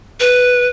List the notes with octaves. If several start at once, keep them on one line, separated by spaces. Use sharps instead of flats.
B4